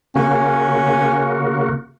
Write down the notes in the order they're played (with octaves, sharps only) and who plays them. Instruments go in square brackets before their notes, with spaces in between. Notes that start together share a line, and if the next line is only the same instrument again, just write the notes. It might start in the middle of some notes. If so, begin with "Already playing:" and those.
[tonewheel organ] C#3 A#3 F#4 [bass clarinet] C#4